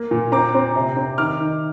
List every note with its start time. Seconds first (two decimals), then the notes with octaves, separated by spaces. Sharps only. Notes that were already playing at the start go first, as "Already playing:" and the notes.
Already playing: A#3
0.11 A#2
0.32 C4 A#5 D6
0.54 C4
0.76 C3
0.97 C4
1.18 D#3 D6 F6
1.40 D#3